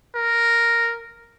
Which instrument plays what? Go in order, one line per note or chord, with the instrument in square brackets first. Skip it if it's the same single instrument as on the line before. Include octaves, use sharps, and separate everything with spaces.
[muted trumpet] A#4